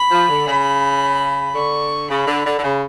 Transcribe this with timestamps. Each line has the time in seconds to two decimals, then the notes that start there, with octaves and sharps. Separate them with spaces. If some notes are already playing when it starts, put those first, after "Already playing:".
Already playing: B5
0.11 F3
0.29 D3
0.48 C#3 B5
1.55 D3 C#6
2.10 C#3 B5
2.27 D3
2.46 D3
2.59 D3
2.64 C#3